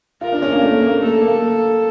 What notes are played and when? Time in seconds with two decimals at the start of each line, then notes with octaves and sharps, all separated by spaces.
0.21 F4 A#4
0.32 D4
0.42 C#4
0.52 A#3
0.62 A3
0.82 A#3
1.01 A3 A4
1.21 A#3